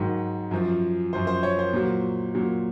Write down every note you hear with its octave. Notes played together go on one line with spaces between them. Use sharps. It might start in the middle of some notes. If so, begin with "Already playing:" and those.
Already playing: G#2 D#3 F#3
F#2 F3
F#2 F3 C5
C5
C#5
C5
A#2 F#3
A#2 F#3